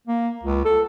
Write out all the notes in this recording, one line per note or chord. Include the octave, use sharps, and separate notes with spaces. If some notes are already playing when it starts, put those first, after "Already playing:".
A#3
C#2
A4